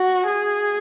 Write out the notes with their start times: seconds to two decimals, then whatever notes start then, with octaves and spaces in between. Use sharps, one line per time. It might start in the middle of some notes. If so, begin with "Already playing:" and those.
Already playing: F#4
0.27 G#4